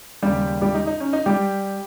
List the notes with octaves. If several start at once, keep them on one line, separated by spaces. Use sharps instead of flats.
D#2 C#3 G3 G#3 G4
G3 G4
D#4
D#4
C#4
D#4
G3 G4